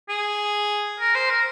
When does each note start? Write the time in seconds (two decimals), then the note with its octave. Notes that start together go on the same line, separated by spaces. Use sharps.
0.09 G#4
0.99 A#4
1.15 C5
1.30 A#4